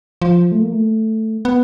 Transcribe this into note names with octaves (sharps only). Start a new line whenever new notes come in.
F3
A3
A#3
A3
B3